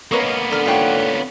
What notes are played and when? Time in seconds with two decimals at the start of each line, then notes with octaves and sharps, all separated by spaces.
0.12 A#3 B3 C#4 A#4 B4 D#5 C#6
0.51 D3 A#5 F6
0.66 G#2 F4 C#5 F#5 G5